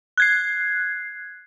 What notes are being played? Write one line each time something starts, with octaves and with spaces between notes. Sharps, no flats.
F#6 G#6 C7